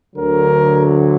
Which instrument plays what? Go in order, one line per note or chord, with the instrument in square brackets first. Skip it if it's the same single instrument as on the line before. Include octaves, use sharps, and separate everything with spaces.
[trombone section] D2 D3 F#3 A#4